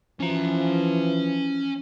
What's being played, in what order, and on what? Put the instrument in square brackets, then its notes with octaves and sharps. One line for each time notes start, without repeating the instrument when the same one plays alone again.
[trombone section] E3 F3 [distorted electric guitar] C#4 A#5